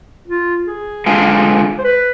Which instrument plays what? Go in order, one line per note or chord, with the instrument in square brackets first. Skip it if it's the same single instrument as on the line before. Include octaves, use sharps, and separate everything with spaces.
[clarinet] F4
G#4
[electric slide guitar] D3 G#3 D4 F4
[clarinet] C5
B4